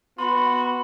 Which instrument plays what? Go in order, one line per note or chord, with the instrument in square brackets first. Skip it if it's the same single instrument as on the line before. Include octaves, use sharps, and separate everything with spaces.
[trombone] B3 [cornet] F#4 [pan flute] B5 [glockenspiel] C6